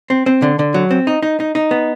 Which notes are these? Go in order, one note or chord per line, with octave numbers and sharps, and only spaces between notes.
C4
C4
D3
D3
F#3
C4
D#4
D#4
D#4
D#4
B3